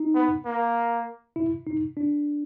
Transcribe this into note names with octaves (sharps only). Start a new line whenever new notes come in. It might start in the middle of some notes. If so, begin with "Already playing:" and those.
Already playing: D#4
B3
A#3
E4
D#4
D4